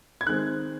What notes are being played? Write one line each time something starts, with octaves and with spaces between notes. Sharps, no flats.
G#6
D#3 G#3 C4 F#6